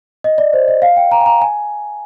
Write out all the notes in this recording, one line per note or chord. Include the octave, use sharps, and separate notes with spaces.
D#5
D5
C5
D#5
F5
G5
A#5
G#5
A#5
G#5